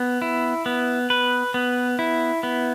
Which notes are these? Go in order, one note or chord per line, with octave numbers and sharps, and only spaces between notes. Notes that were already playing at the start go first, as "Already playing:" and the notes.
Already playing: B3
E4
B3
B4
B3
E4
B3